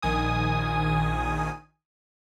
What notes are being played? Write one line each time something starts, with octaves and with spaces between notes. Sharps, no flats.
A#1 D#3 G#5 D#6